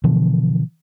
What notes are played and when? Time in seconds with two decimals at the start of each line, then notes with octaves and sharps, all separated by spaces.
0.04 B2 D3 E3 F3